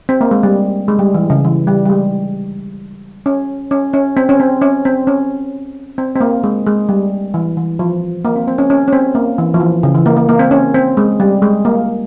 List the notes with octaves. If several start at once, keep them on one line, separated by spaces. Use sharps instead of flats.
C4
A#3
G#3
G3
G#3
G3
E3
C#3
E3
G3
G3
G#3
C#4
C#4
C#4
C4
C#4
C4
C#4
C4
C#4
C4
C4
A#3
G#3
G#3
G3
E3
E3
F3
A#3
C4
C4
C#4
C#4
C#4
C4
A#3
E3
F3
E3
C#3
E3
A#3
A#3
A#3
C4
C#4
C4
G#3
G3
G#3
A#3